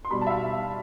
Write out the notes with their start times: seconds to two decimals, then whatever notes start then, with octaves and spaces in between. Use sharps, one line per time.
0.05 C6
0.10 B2 G3 B5
0.21 A5
0.27 E5
0.30 F5